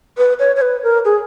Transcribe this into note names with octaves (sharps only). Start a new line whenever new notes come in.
B4
C#5
C#5
B4
A#4
G#4